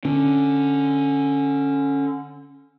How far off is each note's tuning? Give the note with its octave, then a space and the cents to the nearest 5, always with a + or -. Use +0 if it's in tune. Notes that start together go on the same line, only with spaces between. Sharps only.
D3 +0 C#4 +0